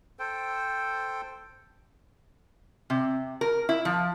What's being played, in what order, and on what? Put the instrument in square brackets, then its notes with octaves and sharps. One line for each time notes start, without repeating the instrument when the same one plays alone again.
[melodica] A4 C5 G5
[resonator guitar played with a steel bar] C3
A#4
E4
F3